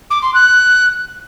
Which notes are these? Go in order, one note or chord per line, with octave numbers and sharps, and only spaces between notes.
D6
C6
F#6